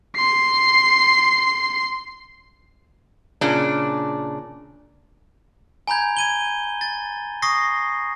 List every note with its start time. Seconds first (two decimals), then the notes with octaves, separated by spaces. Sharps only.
0.16 C6 C7
3.41 A#2 C#3 D4
5.87 G#5 A#5 B5 G6 G#6
6.17 G#6 D#7 G7
6.81 A6
7.42 C#6 D#6 A#6 C7